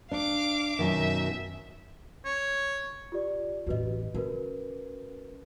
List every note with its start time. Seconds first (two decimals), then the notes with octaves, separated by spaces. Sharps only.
0.11 D4 F5 D6
0.79 F#2 B2 D#3 E5
2.25 C#5
3.12 F4 G4 D5
3.67 A1 E2 F#4 B4 D#5
4.14 C#3 F#4 A#4 B4